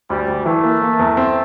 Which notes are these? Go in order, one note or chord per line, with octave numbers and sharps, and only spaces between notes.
D2 G3
D2
E3 A3
A#3
A#3
E2
C4